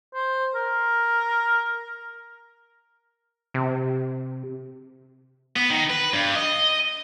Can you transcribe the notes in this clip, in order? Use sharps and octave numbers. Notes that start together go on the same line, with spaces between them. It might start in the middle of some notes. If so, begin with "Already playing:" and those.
C5
A#4
C3
B3
D#3
B4
G2
D#5